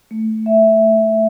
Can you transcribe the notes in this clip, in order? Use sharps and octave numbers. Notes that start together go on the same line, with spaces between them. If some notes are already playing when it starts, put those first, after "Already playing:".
A3
E5